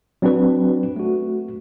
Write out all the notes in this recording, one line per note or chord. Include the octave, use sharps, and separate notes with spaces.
F#3 C4 D4 F#4 B4
A3 F#4